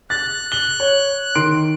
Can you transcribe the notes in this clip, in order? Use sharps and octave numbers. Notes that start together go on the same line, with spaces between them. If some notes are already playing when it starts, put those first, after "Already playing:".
F#6 A6
G7
C#5
D#3 C6 D7